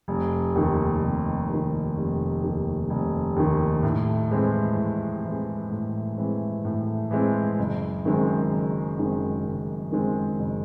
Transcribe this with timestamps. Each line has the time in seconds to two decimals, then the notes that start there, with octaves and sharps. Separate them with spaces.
0.08 F1
0.55 D#2 D#3
1.02 F1
1.49 D#2 D#3
1.96 F1
2.43 D#2 D#3
2.90 F1
3.36 D#2 D#3
3.83 A2
4.30 E3 G#3 C4
4.77 A2
5.24 E3 G#3 C4
5.70 A2
6.18 E3 G#3 C4
6.65 A2
7.11 E3 G#3 C4
7.59 F#1
8.05 F#2 D#3 G#3 C4
8.52 F#1
8.99 F#2 D#3 G#3 C4
9.45 F#1
9.92 F#2 D#3 G#3 C4
10.39 F#1